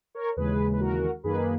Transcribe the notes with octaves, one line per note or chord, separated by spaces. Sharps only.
A#4 C#5
D#2 C#3 E3 G#3 G#4 B4
B4
F#4 A#4
F#2 D#3 A#3 G#4 B4